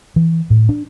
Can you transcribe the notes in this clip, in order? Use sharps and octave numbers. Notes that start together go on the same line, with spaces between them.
E3
A2
D4